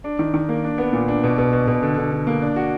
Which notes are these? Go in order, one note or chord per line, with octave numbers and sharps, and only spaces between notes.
D4
D#3
D#3
A#3
D4
B3
A#2
D4
B2
B2
B2
B2
D3
D3
D3
A#3
D4
F#4